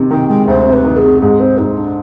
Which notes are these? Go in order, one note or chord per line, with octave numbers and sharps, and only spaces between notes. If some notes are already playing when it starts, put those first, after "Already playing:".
Already playing: C3 D#3
D#3 G5
G#3 G5
D2 C5
C3
B4
D#3
G#4
C3
G#2 G#4
C4 C5
G#2 D#4
D4